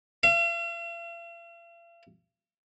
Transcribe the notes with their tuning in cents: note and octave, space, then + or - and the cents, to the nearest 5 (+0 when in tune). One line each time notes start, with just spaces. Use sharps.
F5 -45